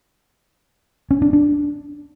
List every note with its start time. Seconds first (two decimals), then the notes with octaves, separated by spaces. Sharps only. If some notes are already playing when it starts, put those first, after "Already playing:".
1.11 C#4
1.22 D4
1.33 D4